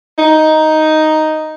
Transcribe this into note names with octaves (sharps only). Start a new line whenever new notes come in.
D#4